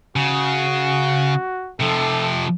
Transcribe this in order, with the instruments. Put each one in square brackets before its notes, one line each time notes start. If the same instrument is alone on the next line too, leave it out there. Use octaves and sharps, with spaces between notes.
[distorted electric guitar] C#3 [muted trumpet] F#4
[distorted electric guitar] C3 F3 [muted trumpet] A4